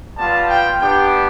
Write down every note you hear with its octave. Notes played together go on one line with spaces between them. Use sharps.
G3 B3 F4 A5
G5
B3 D4 G4 G5